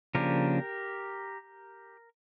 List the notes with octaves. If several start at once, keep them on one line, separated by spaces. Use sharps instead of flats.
C#3 F3 A#3 D4 G4 A#4